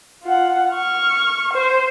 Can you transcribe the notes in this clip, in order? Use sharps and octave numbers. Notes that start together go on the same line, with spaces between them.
F4 F#5
C#6 F6
C5